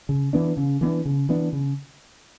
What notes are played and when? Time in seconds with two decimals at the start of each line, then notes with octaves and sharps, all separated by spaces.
0.09 C#3
0.33 E3 B3 D4
0.57 C#3
0.81 E3 B3 D4
1.05 C#3
1.29 E3 B3 D4
1.53 C#3